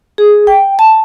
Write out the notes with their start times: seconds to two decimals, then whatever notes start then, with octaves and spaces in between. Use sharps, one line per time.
0.18 G#4
0.47 G5
0.79 A5